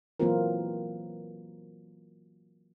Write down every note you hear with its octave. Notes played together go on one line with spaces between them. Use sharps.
E3 F#3 A#3 C4 F4 A#4